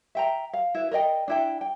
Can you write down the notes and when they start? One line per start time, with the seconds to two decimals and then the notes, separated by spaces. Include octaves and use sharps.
0.15 E5 G5 A#5
0.53 F5
0.74 E4 B4
0.91 A#4 D5 D#5 G5
1.28 D4 E4 G5
1.61 G5